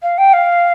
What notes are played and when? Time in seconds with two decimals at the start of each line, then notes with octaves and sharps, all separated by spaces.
0.02 F5
0.18 G5
0.33 F5